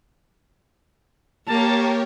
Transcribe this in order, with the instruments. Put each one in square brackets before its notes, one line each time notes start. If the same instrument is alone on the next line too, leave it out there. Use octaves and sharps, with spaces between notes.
[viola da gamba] A#3 [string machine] G4 A#4 C#5 [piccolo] A5